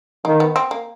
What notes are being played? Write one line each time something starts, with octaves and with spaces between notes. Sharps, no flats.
D#3 A#3
B3
C4
A#3